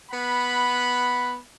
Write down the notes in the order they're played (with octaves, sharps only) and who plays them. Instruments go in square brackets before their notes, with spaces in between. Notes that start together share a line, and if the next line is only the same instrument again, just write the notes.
[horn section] B3 F#5 B5